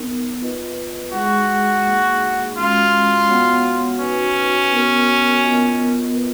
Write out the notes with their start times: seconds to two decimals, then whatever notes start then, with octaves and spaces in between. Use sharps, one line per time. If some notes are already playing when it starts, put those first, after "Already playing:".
Already playing: B3 D#4 A#4
0.42 F4 B4 D#5
1.12 G#3 D#4 F#4 G#4
1.85 A#3 D#4 G#4
2.57 G#3 C#4 F4 F#4
3.28 B3 F#4 C#5 F#5
3.99 C#4 D#4 F#4 B4
4.72 B3 F#4 A#4
5.43 B3 F4 A#4 D#5
6.15 B3 F4 B4